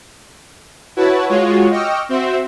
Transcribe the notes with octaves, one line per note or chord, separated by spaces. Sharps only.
E4 F#4 B4 C#5 A5
G#3 F4 F#4 C#5
D#5 G5 C#6 D6 E6 F6
C4 F#4 C5 E5